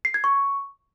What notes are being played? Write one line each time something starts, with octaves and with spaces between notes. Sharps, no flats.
C7
G#6
C#6